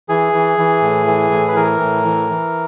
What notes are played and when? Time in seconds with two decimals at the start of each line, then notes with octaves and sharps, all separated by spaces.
0.09 E3 G#4
0.33 E3
0.58 E3
0.82 A2
1.06 E3
1.31 A2
1.48 B4
1.56 E3 A#4
1.80 A2
2.04 E3
2.29 E3